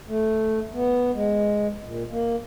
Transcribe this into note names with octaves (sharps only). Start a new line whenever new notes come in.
A3
B3
G#3
A#2
A#3